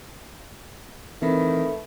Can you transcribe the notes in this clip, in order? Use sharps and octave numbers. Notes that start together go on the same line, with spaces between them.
D#3 E3 A3 C4 B4 B5